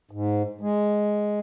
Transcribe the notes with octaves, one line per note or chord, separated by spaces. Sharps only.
G#2
G#3